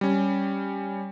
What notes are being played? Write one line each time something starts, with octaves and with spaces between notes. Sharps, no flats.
G3 C#4